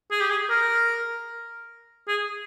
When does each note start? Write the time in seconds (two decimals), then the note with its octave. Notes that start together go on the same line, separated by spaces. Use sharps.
0.11 G#4
0.21 G4
0.31 G#4
0.50 A#4
2.08 G#4